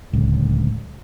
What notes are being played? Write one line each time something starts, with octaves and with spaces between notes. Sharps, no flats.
D1 C#2